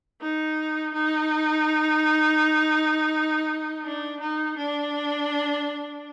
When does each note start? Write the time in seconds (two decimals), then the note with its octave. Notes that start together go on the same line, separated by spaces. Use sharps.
0.21 D#4
0.94 D#4
3.84 D4
4.20 D#4
4.57 D4